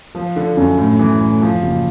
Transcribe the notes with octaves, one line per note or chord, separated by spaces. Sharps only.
F3
D3
F#2
A2
E3
A2
F3
F#1